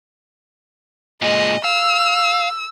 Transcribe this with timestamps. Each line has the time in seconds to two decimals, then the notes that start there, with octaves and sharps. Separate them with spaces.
1.22 A#2 G#3 D#5
1.64 F5 E6